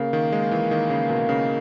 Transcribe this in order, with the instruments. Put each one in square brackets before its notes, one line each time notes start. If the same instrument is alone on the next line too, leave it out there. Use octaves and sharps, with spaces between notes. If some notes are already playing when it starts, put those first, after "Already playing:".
Already playing: [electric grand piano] C#3 [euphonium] A#3
[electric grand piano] D#3
G#3
E3
D#3
C#3
B2
C#3